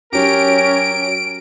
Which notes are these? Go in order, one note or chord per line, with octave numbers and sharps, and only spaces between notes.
F#3 C#4 G4 A#4 D7